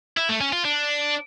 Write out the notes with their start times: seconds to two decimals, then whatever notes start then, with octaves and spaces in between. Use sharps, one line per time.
0.17 E4
0.29 A3
0.41 C#4
0.53 F4
0.65 D4